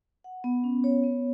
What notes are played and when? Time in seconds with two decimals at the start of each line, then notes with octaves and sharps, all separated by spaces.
0.24 F#5
0.44 B3
0.64 C#4
0.84 C#5
1.04 B3